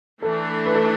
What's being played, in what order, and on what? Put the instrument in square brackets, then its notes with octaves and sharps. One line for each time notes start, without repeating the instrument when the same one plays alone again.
[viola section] E3 A3 D4 [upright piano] A4
[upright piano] B4
A4